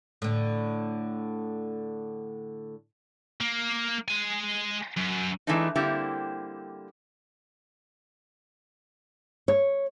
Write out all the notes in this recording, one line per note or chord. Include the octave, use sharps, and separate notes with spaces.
A2 D3
A#3
G#3 G#5
F#2
E3 G#3 A3 D4 D#4
D3 G3 A#3 C4 E4 G4
C#5